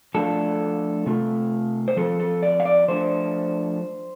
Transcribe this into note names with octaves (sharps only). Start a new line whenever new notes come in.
F3 A3 D4 F4 A4
C3 A3 F4
C5
F3 C4 F4 A4
A4
D5
F5
D5
F3 A3 D4 C5